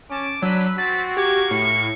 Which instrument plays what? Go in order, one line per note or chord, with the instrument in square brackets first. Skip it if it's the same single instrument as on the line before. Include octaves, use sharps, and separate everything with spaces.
[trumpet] C#4 [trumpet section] A5 D6
[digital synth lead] F#3 [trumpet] D4 [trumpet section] B4 [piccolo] E6
[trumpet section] C4 [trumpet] F#4 [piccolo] A6 [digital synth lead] B6
[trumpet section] A#3 A#4 C#6 [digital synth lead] G4 [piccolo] G#6
[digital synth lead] A2 [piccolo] C#7